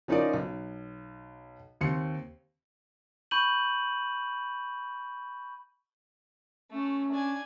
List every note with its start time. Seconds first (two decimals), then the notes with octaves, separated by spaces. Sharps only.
0.08 F3 C#4 D#4 F4 A#4 D5
0.33 B1
1.81 D#2 C4 C6 C#7
3.31 B5 C#6 G6 D#7 F#7
6.72 A3 C#4
7.12 D4 G#5